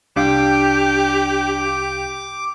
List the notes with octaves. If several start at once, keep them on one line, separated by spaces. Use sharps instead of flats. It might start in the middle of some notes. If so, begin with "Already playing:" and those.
C2 D4 G4 F5 D6